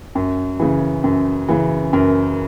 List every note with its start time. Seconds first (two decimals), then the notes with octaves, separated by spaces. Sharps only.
0.15 F#2
0.60 C#3 E3
1.04 F#2
1.49 C#3 E3
1.93 F#2 A#4